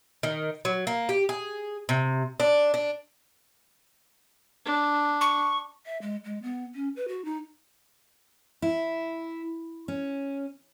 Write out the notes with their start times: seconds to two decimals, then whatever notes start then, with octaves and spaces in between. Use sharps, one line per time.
0.23 D#3
0.65 F#3
0.87 A#3
1.09 G4
1.29 G#4
1.89 C3
2.40 D4
2.74 D4
4.65 D4
5.21 C#6
5.86 E5
6.02 G#3
6.25 G#3
6.43 B3
6.75 C#4
6.96 B4
7.08 F#4
7.25 D#4
8.62 E4
9.88 C#4